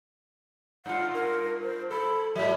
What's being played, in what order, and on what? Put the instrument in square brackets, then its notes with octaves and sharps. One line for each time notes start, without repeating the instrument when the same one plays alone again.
[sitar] G2 F4 [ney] F#5
[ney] A#4
C5
[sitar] A4 [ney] B5
[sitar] G#2 F#3 [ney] E5